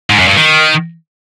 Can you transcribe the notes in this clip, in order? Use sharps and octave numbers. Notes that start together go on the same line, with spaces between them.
G#2
F#2
G2
D#3